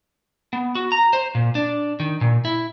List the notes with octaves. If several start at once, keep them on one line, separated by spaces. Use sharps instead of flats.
B3
F#4
A#5
C5
A#2
D4
D#3
A#2
E4